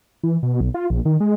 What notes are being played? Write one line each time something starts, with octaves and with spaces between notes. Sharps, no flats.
E3
B2
B1
F4
A#1
D#3
G#3